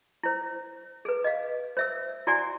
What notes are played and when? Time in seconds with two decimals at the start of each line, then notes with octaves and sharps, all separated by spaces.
0.23 E4 C5
1.05 G#4 B4
1.24 D#5 F5
1.77 C5 E5 E6
2.27 E4 F#4 D5 F#5 G#5 C6